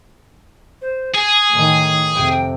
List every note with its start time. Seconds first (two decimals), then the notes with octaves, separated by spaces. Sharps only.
0.81 C5
1.14 G#4 G#5
1.51 A2 D#3
2.14 F2 C3 G5